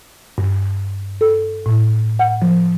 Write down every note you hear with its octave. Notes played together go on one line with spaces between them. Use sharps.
G2
A4
A2
F#5
F3